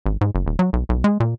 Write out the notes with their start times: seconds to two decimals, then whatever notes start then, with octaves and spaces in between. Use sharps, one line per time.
0.06 G#1
0.21 G#2
0.35 F#1
0.46 D#1
0.59 F#3
0.73 B1
0.89 B1
1.04 G#3
1.20 A#2